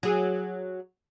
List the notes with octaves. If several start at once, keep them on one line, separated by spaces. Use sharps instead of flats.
F#3 G#4